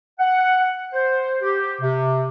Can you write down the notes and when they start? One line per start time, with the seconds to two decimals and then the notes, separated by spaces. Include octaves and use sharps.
0.19 F#5
0.93 C5
1.41 G4
1.81 C3